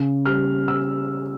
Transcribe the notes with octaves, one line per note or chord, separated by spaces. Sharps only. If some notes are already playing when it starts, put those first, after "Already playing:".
Already playing: C#3
G3 F6
E6